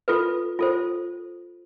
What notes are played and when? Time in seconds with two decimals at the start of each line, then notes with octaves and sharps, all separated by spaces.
0.08 F4 A4 B4
0.59 F4 A4 C5